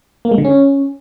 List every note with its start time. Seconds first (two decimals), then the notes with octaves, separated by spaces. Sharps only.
0.25 A#3
0.32 G#3
0.38 D3
0.45 C#4